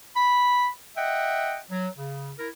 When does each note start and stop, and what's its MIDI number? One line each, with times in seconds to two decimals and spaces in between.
0.16 0.68 83
0.97 1.59 75
0.97 1.59 76
0.97 1.59 78
0.97 1.59 79
1.71 1.88 54
1.98 2.32 49
2.38 2.49 64
2.38 2.49 70